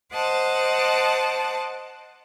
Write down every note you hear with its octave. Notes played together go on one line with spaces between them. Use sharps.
C5 D#5 F#5 A5 D6